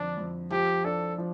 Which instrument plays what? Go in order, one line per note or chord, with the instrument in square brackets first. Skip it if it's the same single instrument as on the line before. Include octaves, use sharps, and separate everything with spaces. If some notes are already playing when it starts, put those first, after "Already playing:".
Already playing: [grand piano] F2 D3 [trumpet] D4
[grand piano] F2
[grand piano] F3 [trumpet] G4
[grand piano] D4 [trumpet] A4
[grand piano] F3